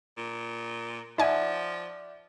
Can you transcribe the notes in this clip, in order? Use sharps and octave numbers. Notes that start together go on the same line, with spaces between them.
A#2
F3 D#4 D5 E5 F#5 G#5